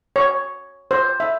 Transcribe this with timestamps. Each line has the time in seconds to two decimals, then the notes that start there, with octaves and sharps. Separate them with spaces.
0.16 C#5
0.91 C5
1.20 E5